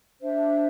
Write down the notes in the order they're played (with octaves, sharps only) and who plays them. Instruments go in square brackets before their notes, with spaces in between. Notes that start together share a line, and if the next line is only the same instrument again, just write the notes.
[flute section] D4 C5 E5